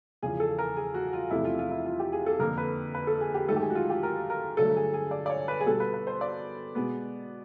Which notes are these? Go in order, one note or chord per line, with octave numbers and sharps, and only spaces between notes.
E2 C#3 F3 G#4
A4
A#4
G#4
F#4
F4
E2 C3 F3 A3 E4
F4
F4
E4
F4
G4
G#4
A4
F2 D3 F3 A#3 A#4
B4
B4
A4
G#4
G4
G#2 D#3 F#3 A3 A4
G4
G#4
F#4
F4
G4
A#4
A#4
G2 D3 F#3 A3 A4
G#4
G#4
D5
D5
C#5
B4
G#4
B2 G3 B3 A4
B4
B4
C5
D5
B2 G#3 B3